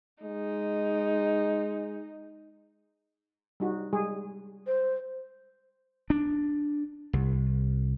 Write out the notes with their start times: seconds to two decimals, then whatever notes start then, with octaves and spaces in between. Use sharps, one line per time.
0.23 G#3 D#4
3.60 G3 D#4 F#4
3.93 G3 G#3 G#4
4.67 C5
6.10 D4
7.13 C2